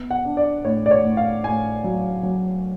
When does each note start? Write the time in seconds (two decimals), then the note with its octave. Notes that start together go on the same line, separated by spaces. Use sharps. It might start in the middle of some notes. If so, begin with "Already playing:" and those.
Already playing: B3
0.11 F#5
0.25 D4
0.37 D5
0.65 A2 C#5
0.86 D5
0.91 C#5
1.04 A2
1.17 F5
1.44 A2 G#5
1.84 F#3
2.23 F#3